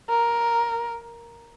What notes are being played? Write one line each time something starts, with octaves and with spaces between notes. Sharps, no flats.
A#4